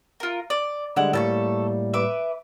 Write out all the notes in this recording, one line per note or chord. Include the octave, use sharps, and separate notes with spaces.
F4 A#4
D5
D3 G3 G#3 E4 F#5
A2 G3 A#3 A4 A5 C#6
B4 E5 D6